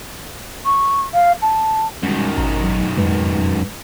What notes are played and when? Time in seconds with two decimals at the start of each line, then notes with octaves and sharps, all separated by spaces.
0.66 C#6
1.14 F5
1.42 A5
2.03 F#2 D#3 G3 G#3
2.38 G#1 A#5
2.63 F#3
2.97 F2 G#2 G#3 B4